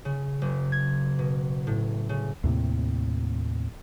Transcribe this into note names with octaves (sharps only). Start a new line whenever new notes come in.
C#3
F#1
G#6
B2
A2
C#3
D#2 A2 C3